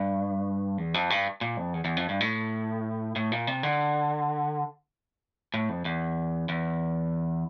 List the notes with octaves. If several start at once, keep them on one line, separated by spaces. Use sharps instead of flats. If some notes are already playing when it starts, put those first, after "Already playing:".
Already playing: G2
E2
F2
G2
A#2
F2
E2
E2
F2
G2
A2
A2
A#2
C3
D3
A2
F2
E2
E2